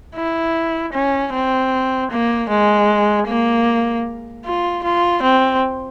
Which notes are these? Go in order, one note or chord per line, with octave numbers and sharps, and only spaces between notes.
E4
C#4
C4
A#3
G#3
A#3
F4
F4
C4